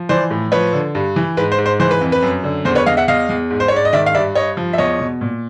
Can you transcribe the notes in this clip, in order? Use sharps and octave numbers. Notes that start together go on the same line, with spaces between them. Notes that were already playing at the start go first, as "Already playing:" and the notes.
Already playing: F3
E3 C5 D5
A2
F3 B4 C#5
D3
G2
E3
G#2 B4
C5
G#2
C5
E3 C5
B4
F2
B4
F#2
D3
E2 C5
B4 C#5
E2 D#5 F5
E5 F#5
E2 D#5 F5
E2
G#2
C5
C#5
G#2 D5
D#5
D#3 D5 E5
F5
G2 D5 E5
G2 C#5 D#5
F3
E5
E2 C#5 D#5
B2
A#2